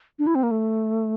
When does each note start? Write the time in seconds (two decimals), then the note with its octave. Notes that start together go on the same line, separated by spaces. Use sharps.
0.19 D4
0.27 E4
0.35 C4
0.43 A#3
0.51 A3